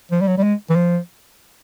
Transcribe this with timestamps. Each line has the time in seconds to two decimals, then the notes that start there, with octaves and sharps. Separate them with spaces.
0.12 F3
0.21 G3
0.28 F#3
0.38 G3
0.43 G#3
0.70 E3
0.76 F3